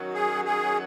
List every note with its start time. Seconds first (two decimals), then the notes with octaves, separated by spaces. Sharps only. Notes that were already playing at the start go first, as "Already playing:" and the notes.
Already playing: F#2 D#3 F#3
0.14 G#4
0.45 G#4